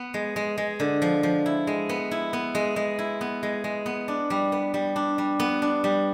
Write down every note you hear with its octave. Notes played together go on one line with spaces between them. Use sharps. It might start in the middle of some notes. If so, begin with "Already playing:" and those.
Already playing: B3
G#3
G#3
G#3
D3
F3
F3
E4
G#3
B3
E4
B3
G#3
G#3
E4
B3
G#3
G#3
B3
D4
G3
B3
G3
D4
G3
B3
D4
G3